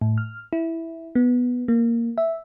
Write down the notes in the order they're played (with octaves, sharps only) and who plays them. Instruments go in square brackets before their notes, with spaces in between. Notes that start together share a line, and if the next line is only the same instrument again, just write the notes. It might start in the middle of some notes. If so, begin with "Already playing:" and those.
[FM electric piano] A2
F6
E4
B3
A#3
E5